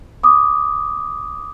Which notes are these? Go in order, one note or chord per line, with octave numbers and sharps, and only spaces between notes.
D6 D#6